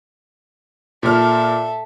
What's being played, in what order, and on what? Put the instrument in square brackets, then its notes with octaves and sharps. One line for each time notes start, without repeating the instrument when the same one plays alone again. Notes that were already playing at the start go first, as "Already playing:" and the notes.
[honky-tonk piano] A#2 F6 [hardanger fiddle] A4 E5